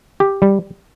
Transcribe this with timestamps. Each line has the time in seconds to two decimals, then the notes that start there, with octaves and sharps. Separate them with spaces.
0.20 G4
0.42 G3